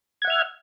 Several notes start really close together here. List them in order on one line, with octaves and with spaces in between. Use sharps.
G#6 F#5 E5 F6